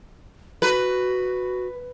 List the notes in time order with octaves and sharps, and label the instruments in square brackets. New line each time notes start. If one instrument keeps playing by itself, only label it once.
[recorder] F#4 [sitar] B4